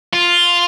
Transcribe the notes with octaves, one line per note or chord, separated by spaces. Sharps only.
F4